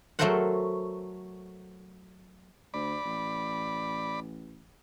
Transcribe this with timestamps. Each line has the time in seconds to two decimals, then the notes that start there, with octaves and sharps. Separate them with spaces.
0.19 F#3 A3 A4 A#4 C5 F#5
2.74 D2 D5 B5
3.05 A1